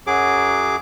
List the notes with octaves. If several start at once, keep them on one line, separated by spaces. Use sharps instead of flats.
F#2 F#3 G#4 D6